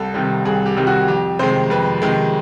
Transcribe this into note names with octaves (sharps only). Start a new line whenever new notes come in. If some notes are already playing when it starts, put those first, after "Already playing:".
Already playing: C2 A4
C3 D#3 G3
C2 G#4
G4
C3 D#3 G3
F#4
F2 G4
C3 D#3 G#3 C5
F2 B4
C3 D#3 G#3